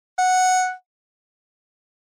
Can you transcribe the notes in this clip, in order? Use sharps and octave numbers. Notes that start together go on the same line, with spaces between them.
F#5